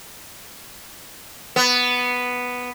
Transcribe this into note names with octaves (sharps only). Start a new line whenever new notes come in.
B3